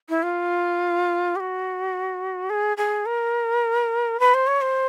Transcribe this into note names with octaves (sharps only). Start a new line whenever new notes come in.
E4
F4
G4
F#4
G#4
G#4
A#4
B4
C5
C#5
C5